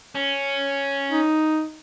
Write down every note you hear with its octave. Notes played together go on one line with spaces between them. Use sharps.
C#4
D#4